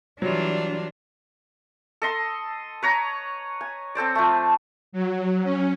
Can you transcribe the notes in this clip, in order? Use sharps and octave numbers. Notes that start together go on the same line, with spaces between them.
E3 F#3 G3 D4 F4
A4 D#5 C6
B4 C#5 A#5
G#5
C4 A4 C5 D5
F3 A3
F#3
C#4